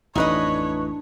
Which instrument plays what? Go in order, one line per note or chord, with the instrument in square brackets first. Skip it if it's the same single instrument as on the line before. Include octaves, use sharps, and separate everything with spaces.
[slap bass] A1 F2 A2 [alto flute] D4 [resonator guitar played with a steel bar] D#4 B4 D#5 [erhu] C#5